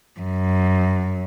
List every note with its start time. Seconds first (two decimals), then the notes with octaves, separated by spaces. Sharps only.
0.19 F#2